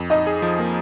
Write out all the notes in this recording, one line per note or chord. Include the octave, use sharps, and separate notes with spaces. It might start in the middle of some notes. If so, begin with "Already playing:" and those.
Already playing: F2
D#4 D#5
G#4
F3
A#3